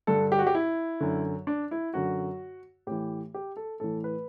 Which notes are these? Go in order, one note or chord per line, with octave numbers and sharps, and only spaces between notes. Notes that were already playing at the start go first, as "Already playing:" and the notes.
G2 D3 A4
G4
F#4
G4
E4
F#2 D3
D4
E4
F#2 D3 F#4
A2 E3 G4
G4
A4
A2 E3 A4
B4